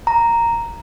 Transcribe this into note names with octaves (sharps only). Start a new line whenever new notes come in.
A#5